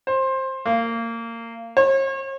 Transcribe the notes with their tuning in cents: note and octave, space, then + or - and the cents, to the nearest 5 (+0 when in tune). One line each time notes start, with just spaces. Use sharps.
C5 +15
A#3 -25
C#5 -45